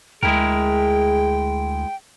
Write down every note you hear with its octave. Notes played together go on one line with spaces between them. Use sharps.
D2 G#3 E4 G#4 A#4 G5